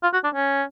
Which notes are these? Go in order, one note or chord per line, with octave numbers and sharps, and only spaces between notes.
F4
F#4
D4
C#4